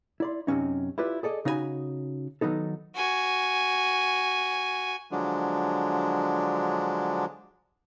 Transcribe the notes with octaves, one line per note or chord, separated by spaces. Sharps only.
E4 D5 C6
F#2 C3 G#3 C#4 D#4
E4 F4 G4 B4 D5
G#4 A4 D5 D#5
C#3 D#4 F#4 A#4 G#5 B5
D#3 F#3 B3 D#4 A4
F#4 G#5
D3 F3 F#3 G#3 D4